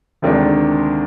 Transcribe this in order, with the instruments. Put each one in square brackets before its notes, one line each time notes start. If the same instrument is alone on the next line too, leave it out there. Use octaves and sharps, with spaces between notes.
[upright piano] D2 C3 D#3 G#3 D4